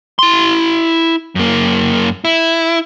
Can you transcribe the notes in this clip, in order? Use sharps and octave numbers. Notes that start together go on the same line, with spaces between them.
E4 C6
F#2 A#3
E4